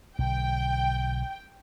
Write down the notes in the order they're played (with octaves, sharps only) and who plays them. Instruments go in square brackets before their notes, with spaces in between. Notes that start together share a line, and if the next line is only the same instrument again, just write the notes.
[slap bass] B1 D3 [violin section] G5